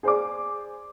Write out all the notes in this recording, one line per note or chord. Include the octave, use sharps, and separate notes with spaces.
G#4 C5 D5 D6